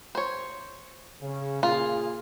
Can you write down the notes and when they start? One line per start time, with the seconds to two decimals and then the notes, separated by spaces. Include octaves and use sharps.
0.15 C5 C#5
1.22 C#3
1.63 A#2 F4 G#4